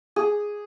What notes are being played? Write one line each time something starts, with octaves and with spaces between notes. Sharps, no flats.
G#4